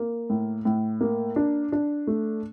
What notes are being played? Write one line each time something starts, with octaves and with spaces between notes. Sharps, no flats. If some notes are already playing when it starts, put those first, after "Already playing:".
Already playing: A#3
A2
A2
A#3
D4
D4
A3